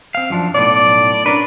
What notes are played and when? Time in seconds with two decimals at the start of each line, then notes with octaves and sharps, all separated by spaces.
0.15 C4 F5
0.30 F#2 F3 D4
0.54 B1 A2 D5
1.26 C#4 D4 A#4 B4